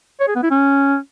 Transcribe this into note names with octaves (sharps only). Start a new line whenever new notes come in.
C#5
G#4
B3
E4
C#4